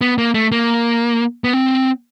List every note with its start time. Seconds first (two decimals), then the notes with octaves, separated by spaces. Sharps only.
0.01 B3
0.18 A#3
0.34 A3
0.52 A#3
1.44 B3
1.53 C4